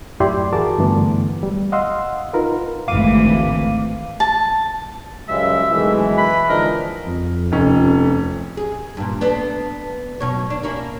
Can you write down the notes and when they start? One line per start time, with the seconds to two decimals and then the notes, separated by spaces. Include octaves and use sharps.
0.20 F#2 A2 E4 G4 D5 C6
0.53 E3 F#4 G#4 A#4 A5 D6
0.78 G2 D3 E3 A3 B3
1.43 G3
1.72 D#5 F5 F#5 C6 E6
2.33 D#4 F4 A#4 B4
2.88 G#1 D2 E3 F5 D6 D#7
4.20 A5
5.28 C#2 F#2 C#3 G3 G#3 E5
5.72 F#2 B2 D#3 E3 G#3 A3
6.18 B4 B5
6.49 D3 F3 G#3 D4 D#4 A#4 D#5
7.07 F2
7.52 F1 C#4
8.57 G#4
8.97 G2 A#2
9.21 B3 D4 A4
10.20 F#2 B2 C#5
10.50 D4
10.63 A#3 C#4 E4